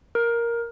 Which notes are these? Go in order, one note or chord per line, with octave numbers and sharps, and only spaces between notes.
A#4